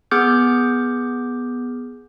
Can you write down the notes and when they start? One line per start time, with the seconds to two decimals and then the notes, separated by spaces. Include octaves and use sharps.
0.11 B3 G#4 D6 F6 G6